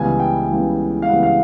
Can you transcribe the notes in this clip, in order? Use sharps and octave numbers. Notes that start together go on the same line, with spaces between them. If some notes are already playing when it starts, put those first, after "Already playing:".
Already playing: C#2 C#3 E3 G3 B3 G#5
G5
C#2 C#3 E3 G3 B3
F5
C#2 C#3 E3 G3 B3 F#5
F5